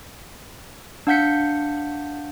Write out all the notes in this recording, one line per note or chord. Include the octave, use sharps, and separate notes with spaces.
D4 F5 F#5 G6 B6 C#7